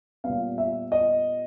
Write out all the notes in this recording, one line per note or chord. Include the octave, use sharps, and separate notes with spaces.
A#2 G3 B3 F5
E5
D#5